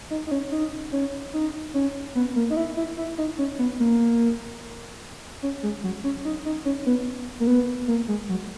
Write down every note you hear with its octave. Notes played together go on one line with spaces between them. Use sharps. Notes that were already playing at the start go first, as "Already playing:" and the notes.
D#4
D#4
C#4
D#4
C#4
D#4
C#4
B3
A#3
D#4
E4
E4
E4
D#4
C#4
B3
A#3
C#4
G#3
F#3
C#4
D#4
D#4
C#4
B3
A#3
B3
A#3
G#3
F#3